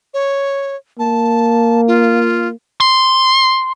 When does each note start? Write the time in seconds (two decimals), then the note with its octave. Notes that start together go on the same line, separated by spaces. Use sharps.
0.14 C#5
0.99 A#3 A5
1.87 F4
2.81 C6